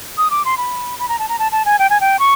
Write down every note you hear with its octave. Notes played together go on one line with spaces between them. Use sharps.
D#6
D6
C6
B5
B5
A#5
A5
A#5
A5
A5
G#5
G5
G#5
G5
C#6